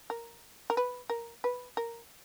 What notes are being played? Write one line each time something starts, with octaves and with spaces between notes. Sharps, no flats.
A#4
A#4
B4
A#4
B4
A#4